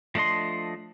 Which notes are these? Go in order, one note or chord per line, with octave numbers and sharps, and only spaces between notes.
F3 A3 D4 D#5 C6